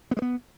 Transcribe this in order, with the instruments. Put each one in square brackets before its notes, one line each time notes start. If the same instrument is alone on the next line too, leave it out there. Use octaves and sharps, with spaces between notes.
[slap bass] B3
G#3
B3